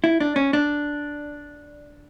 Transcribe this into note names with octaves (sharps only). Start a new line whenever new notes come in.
E4
D4
C#4
D4